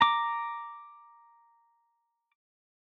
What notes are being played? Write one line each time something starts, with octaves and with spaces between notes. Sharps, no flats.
A#5 D6